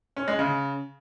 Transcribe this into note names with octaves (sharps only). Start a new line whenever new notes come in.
C#4
G#3
C#3